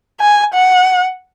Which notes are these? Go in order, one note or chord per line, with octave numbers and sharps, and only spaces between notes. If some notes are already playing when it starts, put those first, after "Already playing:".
G#5
F#5